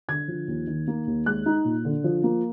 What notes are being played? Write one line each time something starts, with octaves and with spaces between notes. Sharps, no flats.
D3 G#6
F3
D#2
D#3
A#3
D#2
G#3 F#6
D#4
A#2
D3
F3
A#3